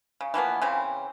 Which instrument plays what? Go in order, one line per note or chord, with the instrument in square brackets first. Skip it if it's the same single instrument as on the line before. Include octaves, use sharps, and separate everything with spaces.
[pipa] C#3
E3 F3 A#3 B3
C#3 E3 C4